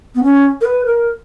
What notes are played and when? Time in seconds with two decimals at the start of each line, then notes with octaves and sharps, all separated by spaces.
0.15 B3
0.23 C#4
0.61 A#4
0.65 B4
0.86 A#4